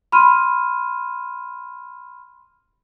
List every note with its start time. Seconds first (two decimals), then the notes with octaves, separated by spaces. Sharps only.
0.12 B5 C6 F6 D#7